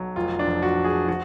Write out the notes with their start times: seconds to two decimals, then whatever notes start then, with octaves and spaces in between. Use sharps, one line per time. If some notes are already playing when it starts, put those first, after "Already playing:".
Already playing: B1 F#3
0.16 F1 F4
0.39 D4
0.47 F2
0.63 F#4
0.77 F1
0.84 G#4
1.08 F3 F#4